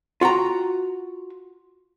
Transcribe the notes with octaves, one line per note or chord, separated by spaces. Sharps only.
F4 F#4 G5 A#5